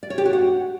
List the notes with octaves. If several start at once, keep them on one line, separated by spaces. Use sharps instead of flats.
D5
C#5
G4
F#4
F#5